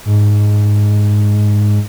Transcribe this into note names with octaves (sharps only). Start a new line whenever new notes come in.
G#2